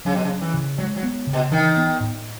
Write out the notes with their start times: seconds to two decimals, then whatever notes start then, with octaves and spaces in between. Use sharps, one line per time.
0.05 C#3 F#3
0.15 B2
0.24 C#3
0.30 C#4
0.41 E3
0.54 C#3
0.78 F#3 G#3
0.96 F#3
1.03 B3
1.27 C#3
1.33 B2
1.51 D#3 E3
1.76 B3
2.00 A2